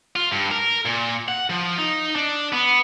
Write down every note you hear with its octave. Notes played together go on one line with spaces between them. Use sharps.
F4
G2
A#4
A#2
F#5
F3
D#4
D4
B3